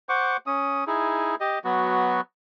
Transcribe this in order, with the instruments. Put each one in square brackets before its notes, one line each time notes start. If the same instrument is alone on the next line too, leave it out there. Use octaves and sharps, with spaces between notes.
[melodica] C5 F#5 C#6 D6
C#4 D#6
D#4 E4 G#4
G4 D#5
F#3 B3 F#4